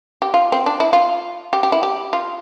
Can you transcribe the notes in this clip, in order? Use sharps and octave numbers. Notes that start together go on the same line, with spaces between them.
G4
F4
C4
D4
E4
F4
G4
G4
E4
G4
F4